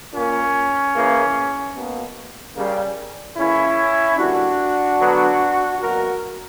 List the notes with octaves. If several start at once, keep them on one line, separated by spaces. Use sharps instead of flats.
A#2 A#3 C#4
C#3 E3 A#3
B2 A#3
C#3 G3 A#3
C#3 E3 A#3 C#4 E4
D3 G3 A#3 D4 F#4
D3 F#3 B3
B2 F#3 A#3 F#4 A#4